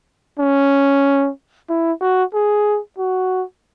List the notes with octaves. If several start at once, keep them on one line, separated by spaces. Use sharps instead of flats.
C#4
E4
F#4
G#4
F#4